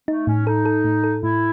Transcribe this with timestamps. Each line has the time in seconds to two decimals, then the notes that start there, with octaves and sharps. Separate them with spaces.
0.08 A3 D#4
0.27 A2 C#4
0.47 D#4 A4
0.65 A4
0.84 A2
1.04 A4
1.23 A2 E4